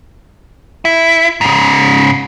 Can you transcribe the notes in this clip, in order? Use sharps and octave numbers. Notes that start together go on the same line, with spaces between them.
E4
G#2 C#3